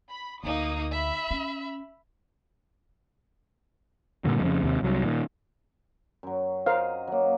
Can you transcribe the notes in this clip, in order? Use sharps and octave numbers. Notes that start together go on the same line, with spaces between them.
B5
D2 A#3 D#4 D#6
E5 B5
C#4
G2 A#2 D3 F#3
F2 C#3
D#2 C3
C2 F#3
A#2 D#3
F#2 F#3
A#4 C5 D#5 F5
F#3 A#3